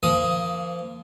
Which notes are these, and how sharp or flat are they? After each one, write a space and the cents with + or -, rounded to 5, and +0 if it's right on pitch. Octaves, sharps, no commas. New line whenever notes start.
F3 -25 A#3 +0 D#6 +10